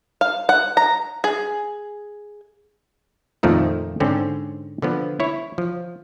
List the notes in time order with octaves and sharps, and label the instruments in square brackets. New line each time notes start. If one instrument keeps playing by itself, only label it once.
[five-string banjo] F5
F#5
A#5
G#4
[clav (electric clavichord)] F2 A#2 D#3 F3 A3 D#4
G#2 D3 C4 C#4
D3 F3 B3
E4 C#5
F3